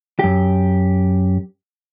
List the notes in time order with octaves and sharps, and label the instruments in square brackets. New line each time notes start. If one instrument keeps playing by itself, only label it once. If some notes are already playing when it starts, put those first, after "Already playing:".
[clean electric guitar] F#2 G4